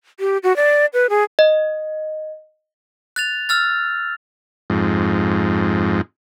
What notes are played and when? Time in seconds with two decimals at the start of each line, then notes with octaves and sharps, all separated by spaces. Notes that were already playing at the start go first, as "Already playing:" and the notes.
0.20 G4
0.43 F#4
0.56 D5
0.93 B4
1.10 G#4
1.39 D#5
3.16 F#6 A6 F7
3.49 E6 F6 A6
4.70 F2 G#2